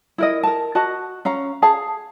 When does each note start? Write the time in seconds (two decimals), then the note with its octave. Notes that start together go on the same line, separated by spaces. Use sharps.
0.18 E4 A#4 D#5
0.43 A#4 A5
0.75 F#4 D#5 A5
1.25 C#4 F5 A#5
1.62 G#4 F5 A5